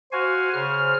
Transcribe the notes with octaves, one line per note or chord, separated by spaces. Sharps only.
F#4 C5 F5 G#5
C#3 F6